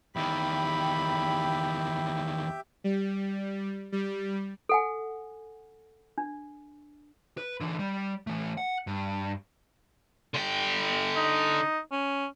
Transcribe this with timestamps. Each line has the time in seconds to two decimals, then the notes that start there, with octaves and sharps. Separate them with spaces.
0.16 E2 D#3 G4 E5 G5 B5
2.84 G3
3.92 G3
4.69 A4 F#5 G#5
6.18 D4
7.37 B4
7.61 D3 E3
7.79 G3
8.27 E3 A3
8.57 F#5
8.87 G2
10.34 D3 G5
11.16 D#4
11.92 C#4